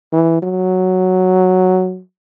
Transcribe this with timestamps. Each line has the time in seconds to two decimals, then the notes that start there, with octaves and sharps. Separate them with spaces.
0.13 E3
0.42 F#3